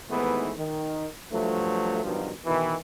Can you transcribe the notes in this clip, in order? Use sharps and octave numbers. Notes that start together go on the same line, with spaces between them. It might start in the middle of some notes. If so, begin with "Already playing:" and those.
D#2 G#2 E3 A3 B3
D#3
G2 F3 F#3 A3
G2 B2 D#3 F3 F#3
B2 D#3 E3